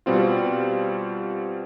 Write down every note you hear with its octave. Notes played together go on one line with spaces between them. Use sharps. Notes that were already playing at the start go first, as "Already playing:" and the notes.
B2 G3 C4 F4